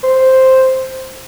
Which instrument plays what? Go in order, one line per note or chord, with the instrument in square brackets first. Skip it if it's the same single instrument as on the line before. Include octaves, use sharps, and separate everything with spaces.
[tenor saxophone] C5